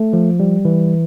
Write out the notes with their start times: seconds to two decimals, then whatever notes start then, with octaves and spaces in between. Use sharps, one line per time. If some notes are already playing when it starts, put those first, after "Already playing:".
Already playing: A3
0.13 F3
0.40 G3
0.65 E3